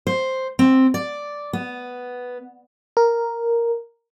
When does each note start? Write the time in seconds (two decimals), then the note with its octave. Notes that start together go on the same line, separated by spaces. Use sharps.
0.07 C5
0.59 C4
0.94 D5
1.53 B3
2.97 A#4